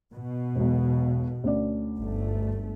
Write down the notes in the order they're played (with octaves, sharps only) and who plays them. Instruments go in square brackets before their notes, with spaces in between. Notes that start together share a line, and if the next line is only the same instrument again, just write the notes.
[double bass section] B2
[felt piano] E1 B1
D2 C#4 D5
[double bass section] G1 A3